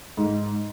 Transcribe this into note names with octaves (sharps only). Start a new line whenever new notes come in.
G#2